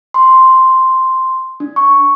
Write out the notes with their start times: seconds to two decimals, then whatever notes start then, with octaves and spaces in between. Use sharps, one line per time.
0.14 C6
1.60 D4
1.76 C#6